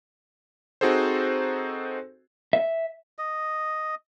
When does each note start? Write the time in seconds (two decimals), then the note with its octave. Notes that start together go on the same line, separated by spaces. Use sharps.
0.81 C4 D#4 F#4 G#4 A4 C5
2.53 E5
3.18 D#5